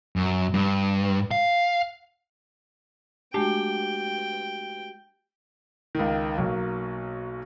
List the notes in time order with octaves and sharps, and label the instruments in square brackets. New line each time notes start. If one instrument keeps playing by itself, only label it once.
[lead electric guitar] F#2
G2
F5
[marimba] G#3 A3 D4 [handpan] F#4 G4 [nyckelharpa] G5
[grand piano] C#2 D#3
B1 F#3 A#3